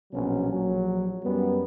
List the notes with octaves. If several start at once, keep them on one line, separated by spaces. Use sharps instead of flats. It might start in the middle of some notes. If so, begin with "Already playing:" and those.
A#1 B2 F#3 C#4
A#1 F#3
F#2 G3 B3